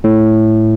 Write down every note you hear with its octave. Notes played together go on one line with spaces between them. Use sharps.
A2